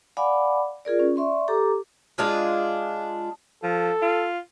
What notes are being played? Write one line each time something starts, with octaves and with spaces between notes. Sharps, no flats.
D5 F5 F#5 G#5 B5 D6
F4 G#4 A#4 D5
C#4
D5 E5 C6 C#6
G4 A4 A#5 D6
G#3 D4 F4 G#4
F3 A4
F4